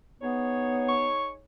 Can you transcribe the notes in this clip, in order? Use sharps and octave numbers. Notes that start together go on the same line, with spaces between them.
B3 D#4 G#4 C#5
C#6